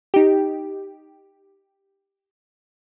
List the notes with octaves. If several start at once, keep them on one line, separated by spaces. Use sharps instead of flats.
D#4 G4